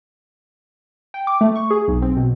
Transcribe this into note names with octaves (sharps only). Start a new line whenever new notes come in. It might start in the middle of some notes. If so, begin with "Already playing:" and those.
G5
D6
A3
C#6
G#4
B1
C4
B2